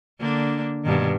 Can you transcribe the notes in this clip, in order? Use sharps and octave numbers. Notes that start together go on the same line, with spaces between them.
D3 A#3 D4
G2 B2 D#3